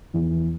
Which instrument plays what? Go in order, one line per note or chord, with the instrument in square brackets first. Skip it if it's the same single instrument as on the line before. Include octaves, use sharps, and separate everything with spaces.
[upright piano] E2